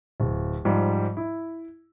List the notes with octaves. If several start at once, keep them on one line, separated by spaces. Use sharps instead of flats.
D1
G#2 F3 G3
E4